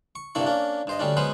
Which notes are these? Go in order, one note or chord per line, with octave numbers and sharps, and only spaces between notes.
C#6
G2 C3 A#3 D4 E4 C#6
A#3 C#4 D4
G2 C5 D#5
D2 G3 C#4 D4
F#3 G#3 B3 C#4 B4 C5